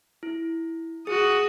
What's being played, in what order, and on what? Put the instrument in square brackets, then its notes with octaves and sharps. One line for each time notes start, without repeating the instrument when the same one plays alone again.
[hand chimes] E4
[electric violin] F#4 D#6 [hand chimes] G#4